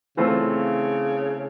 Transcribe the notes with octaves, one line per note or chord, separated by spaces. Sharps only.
C#3 E3 A3 C4 F4 A4